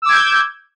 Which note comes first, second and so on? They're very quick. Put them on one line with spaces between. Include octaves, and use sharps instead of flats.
E6 D6 G#6 G6